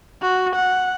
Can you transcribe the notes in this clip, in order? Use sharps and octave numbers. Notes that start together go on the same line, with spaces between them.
F#4
F#5